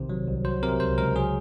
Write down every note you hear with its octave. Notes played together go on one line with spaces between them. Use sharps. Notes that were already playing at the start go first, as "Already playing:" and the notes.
Already playing: A#1 C3 D#3 C5
F#3
C2
F#3 C5
C3 A#4
C#2 C5
C#2 A#4
F#3 G#4